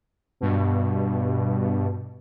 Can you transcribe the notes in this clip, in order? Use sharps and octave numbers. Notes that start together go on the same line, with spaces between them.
G2 B2